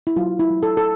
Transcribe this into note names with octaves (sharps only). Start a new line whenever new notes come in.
E4
F#3 F4
E4
F#3
A4
A4